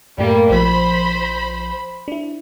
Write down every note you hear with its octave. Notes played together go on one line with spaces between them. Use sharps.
F#2 A2 G3 A3 A#3
A#1 F3 C5 B5
D4 E4